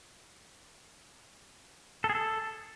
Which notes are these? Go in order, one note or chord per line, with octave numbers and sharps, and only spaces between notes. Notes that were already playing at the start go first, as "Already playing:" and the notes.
A4
G#4
A4